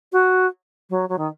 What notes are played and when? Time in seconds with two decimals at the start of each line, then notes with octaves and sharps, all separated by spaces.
0.12 F#4
0.90 F#3
1.09 F#3
1.18 D#3